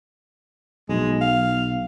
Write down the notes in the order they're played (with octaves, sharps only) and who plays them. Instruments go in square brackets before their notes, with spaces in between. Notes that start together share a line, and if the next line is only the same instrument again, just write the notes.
[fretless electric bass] B1 [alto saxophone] G#3
[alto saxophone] F5